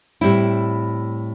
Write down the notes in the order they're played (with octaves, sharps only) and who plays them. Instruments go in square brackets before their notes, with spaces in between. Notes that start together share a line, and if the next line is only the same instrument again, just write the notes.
[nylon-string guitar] A2 G3 C4 E4